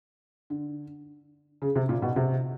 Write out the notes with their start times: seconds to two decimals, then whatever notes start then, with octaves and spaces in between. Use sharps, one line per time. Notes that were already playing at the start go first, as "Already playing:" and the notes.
0.50 D3
1.62 C#3
1.76 C3
1.89 A#2
2.02 B2
2.16 C3